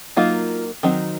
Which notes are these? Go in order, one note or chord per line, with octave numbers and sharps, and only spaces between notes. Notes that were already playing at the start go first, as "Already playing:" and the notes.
F#3 A#3 D#4 F4
D#3 F#3 C4 D#4